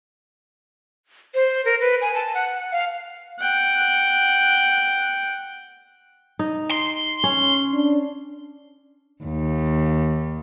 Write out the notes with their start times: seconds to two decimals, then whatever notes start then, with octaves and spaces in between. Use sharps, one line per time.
1.35 C5
1.65 A#4
1.81 B4
2.01 G#5
2.15 A5
2.35 F#5
2.72 F5
3.40 F#5 G5
6.39 D#4
6.71 C6
7.24 C#4
7.74 D4
9.23 D#2